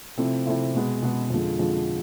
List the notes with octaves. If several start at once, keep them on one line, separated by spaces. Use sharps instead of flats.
C3 F3 A3 C4 E4
C3 F3 A3 C4 E4
B2 G#3 B3
B2 G#3 B3
F2 D3 F3 G#3
F2 D3 F3 G#3